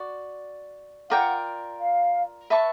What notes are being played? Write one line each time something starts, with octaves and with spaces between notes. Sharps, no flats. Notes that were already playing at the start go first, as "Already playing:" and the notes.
Already playing: F#4 D5
F4 A#4 D5 F#5 G5
F5
B4 E5 A5 C#6